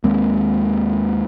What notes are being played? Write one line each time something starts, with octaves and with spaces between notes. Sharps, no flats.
D#2 G#3 A#3 C4